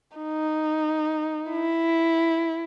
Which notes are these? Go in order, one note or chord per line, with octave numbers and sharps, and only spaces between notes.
D#4
E4